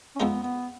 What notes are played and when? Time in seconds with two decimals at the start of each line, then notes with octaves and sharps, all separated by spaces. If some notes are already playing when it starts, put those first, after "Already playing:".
0.15 C#4
0.20 F2 F3 G#3 B3 D#4
0.43 B3